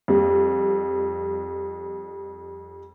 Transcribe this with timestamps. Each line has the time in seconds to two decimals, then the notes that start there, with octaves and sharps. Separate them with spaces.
0.08 F2 G3